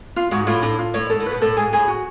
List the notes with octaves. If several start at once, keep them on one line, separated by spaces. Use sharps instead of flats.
F4
G#2 F#4
A2 F4
A2 D4
F4
A2 C#5
G#2 A4
A2
B2 B4
A2 A4
G#2 G#4
A2 G#4
F#4